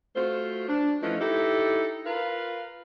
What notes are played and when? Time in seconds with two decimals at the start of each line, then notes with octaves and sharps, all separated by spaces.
0.16 A3 F4 F#4 C5
0.68 D4
1.02 E3 F3 A3 C#4 D#4
1.20 D#4 E4 G4 A4
2.05 F4 A#4 B4 F5